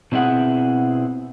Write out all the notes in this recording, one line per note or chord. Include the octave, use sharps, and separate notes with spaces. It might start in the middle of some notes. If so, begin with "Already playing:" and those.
B2 C4 E4 G#4 F#5